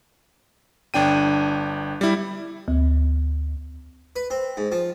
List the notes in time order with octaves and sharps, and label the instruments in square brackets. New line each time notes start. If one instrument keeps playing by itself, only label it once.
[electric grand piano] G1 D4 G5 D#7
G3 E4
[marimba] D2
[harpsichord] B4
C4
G#2
F3